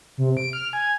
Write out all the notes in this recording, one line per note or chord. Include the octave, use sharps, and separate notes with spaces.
C3
D7
F6
G#5